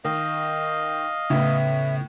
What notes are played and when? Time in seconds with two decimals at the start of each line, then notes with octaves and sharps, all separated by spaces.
0.04 D#3 D#5 F5
1.30 A2 C#3 B3 E5